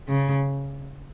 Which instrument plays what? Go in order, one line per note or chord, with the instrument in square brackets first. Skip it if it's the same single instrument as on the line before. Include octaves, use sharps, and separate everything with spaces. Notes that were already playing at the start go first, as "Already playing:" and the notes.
[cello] C#3